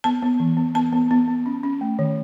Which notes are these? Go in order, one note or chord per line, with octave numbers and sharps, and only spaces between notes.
B3 A5
B3
E3
B3
B3 A5
B3
B3
B3
C#4
C#4
A3
D#3